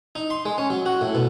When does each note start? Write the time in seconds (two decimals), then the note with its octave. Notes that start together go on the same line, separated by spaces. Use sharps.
0.15 D#4
0.30 C6
0.46 G#3
0.58 C#4
0.70 F#3
0.86 F#4
1.01 A2
1.15 B2